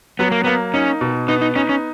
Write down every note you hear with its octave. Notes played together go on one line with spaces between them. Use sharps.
F#3 B3
A#3
A#3 B3
C#4 D#4
B2
B3 D#4
D#4
C#4 D#4
C#4